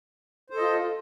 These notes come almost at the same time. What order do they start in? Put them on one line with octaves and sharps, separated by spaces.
C5 A4 D#5 F4